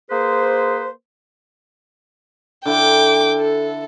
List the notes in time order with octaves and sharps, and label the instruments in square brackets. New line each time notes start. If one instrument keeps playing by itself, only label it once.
[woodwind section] A#3 G#4 B4 C5
[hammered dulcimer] D3 E4 F#5 [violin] G5 D6
[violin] A4